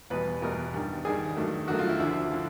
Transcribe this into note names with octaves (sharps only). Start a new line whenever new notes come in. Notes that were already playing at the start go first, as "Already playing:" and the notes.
E2 B2 G3 B4
E2 B2 G3 A#4
G2 D#3 G3
G2 D#3 G3 G#4
G2 D#3 F#3 A3
G2 D#3 F#3 A3 F#4
F4
E4
D2 D3 F3 E4
D3 F3